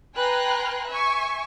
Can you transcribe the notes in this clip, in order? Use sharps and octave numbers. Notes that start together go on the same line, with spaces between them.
B4 G5 G#5 A#5 C6 F#6
E5 G#5 C#6